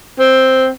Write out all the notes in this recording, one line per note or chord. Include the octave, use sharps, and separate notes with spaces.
C4